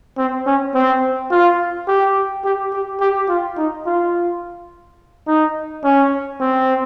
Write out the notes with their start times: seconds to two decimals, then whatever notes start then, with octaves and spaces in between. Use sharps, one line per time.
0.18 C4
0.46 C#4
0.75 C4
1.31 F4
1.88 G4
2.44 G4
2.73 G4
3.01 G4
3.29 F4
3.57 D#4
3.86 F4
5.27 D#4
5.84 C#4
6.41 C4